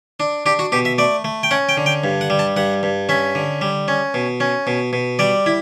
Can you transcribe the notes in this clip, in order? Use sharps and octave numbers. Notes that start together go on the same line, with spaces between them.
D4
D4 G4
F#4
B2 G4
E5
A3 D5
A3
G5
C#4 F#5
G5
D3
G5
G2
F#5
G3
A5
G2 F#5
G2
C#4 E5
D3
G3
C#4
B2
C#4
B2
B2
G3 D5
E4